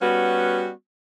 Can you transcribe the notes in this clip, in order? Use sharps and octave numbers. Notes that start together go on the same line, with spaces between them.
G3 B3 C#4 F#4